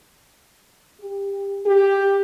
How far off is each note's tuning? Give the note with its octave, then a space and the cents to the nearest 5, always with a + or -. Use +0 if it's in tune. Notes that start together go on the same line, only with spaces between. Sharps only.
G4 +20
G4 +10